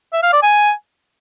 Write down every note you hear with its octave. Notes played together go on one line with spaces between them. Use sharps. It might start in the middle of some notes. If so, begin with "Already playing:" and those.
E5
F5
D5
G#5